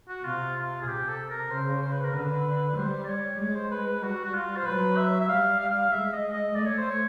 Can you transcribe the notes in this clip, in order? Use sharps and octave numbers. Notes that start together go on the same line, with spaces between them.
F#4
C3 F4
F4
G#4
C3 G4
A4
A#4
C#3 C5
C5
B4
A#4
D3 B4
G3 C5
D5
C#5
G#3 C#5
C5
G#3 B4
B4
G3 F#4
F#4
F4
C5
F#3 B4
E5
E5
G3 F5
F5
F5
G#3 E5
D#5
D#5
A3 D5
C#5
C5
C#5